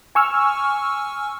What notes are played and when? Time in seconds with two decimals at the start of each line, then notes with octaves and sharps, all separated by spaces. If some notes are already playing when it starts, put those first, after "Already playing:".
0.15 G#5 C#6 E6 F6